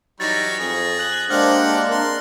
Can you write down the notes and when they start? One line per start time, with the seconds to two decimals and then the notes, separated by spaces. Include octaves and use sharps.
0.20 E3 F#3 G3 D#4 C#5 A6 A#6
0.59 F2 G#4
0.99 F#6 F#7
1.30 G#3 A#3 D4 G4 A#4 C5 F#5 F6
1.89 C4 A#4 C6